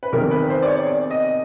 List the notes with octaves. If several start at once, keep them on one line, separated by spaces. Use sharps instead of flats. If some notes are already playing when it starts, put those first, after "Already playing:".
B4
E2 C3 D#3 G3 A#4
B4
C5
D5
C#5
D5
D#5